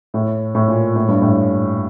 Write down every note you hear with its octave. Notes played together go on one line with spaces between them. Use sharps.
A2
A2
A#2
A2
G2
A2